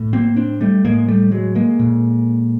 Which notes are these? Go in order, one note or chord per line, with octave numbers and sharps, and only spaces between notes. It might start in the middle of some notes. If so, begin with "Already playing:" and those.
Already playing: A2
A#3 C4
C4 D4
G3 A3
A2 G#3 A#3
G3 A3
F#3 G#3
G#3 A#3
A#2